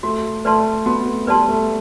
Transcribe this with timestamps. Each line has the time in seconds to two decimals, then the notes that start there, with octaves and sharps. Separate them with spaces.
0.03 A3 F#4
0.45 A3 B4 D5 A5 C6
0.86 B3 F#4
1.07 A3
1.27 G3 B4 D5 A5 C6
1.49 A3